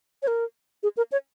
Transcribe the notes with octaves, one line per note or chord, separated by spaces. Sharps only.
C#5
A#4
G#4
A#4
C#5